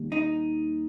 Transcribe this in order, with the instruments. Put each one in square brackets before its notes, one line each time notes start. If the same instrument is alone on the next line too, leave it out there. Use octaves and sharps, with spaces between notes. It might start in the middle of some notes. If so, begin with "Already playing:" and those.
Already playing: [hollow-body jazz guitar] D#2 G3
D#4